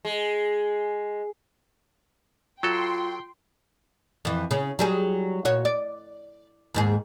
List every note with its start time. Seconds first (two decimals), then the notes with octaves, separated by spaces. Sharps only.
0.05 G#3
2.63 F#3 F4 A4 G5 C6
4.25 F2 E3
4.51 C#3 C#4
4.79 F#3 G3 G#4
5.45 A#2 F#4 C#5
5.65 D5
6.74 D#2 G#2 G#4